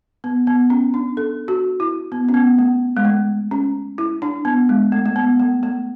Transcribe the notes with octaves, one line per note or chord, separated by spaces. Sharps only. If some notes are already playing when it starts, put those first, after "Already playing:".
B3
B3
C#4
D4
A4
F#4
E4
B3
C#4
B3
A3
G#3
A3
C#4
E4
D4
B3
G#3
A3
A3
B3
A3
A3